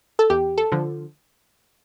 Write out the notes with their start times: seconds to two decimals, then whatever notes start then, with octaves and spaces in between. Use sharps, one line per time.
0.19 A4
0.30 E2 G4
0.58 A4
0.72 D3 F3